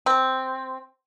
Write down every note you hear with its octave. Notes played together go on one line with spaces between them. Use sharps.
C4